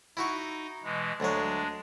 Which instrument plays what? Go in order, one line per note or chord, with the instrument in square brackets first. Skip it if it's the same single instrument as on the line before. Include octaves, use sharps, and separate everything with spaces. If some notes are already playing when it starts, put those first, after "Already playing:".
[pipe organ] D#4 [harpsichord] E4 F#4 C#6
[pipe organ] B2 E3 G#3
[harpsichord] D2 F#3 C#5 [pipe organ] G#3 D4